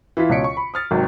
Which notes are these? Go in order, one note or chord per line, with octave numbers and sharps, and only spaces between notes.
E3 E4 F4 B6
C#2 B2 C#5 B6 C#7 D7
C#6
B5
D#6 F6 A6
G#1 C3 F#3 G5